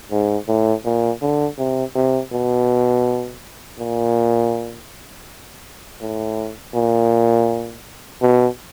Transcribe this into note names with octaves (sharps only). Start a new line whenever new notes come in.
G#2
A2
A#2
D3
C3
C3
B2
A#2
A2
A#2
B2